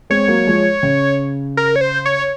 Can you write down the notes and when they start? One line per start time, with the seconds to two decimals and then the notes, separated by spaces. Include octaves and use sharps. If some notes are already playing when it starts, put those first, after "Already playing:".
0.10 G#3 C4 C#5
0.28 F#3 A#3
0.47 F3 G#3
0.83 C#3
1.57 A#4
1.76 C#5
1.81 C5
2.06 C#5